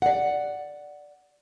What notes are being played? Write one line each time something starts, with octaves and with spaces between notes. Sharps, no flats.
D5 F#5